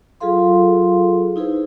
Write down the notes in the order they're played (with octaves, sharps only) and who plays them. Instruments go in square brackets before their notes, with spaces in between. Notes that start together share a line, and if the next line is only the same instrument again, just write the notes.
[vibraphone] F#3 F4 G#4 A4 F5 C6
D#4 E4 G#4 B4 C5